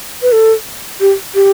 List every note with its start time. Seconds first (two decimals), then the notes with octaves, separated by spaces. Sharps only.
0.22 B4
0.32 A4
1.00 G4
1.35 G4